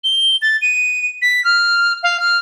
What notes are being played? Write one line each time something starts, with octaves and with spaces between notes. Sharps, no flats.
G7
A6
D#7
B6
F6
F5
F6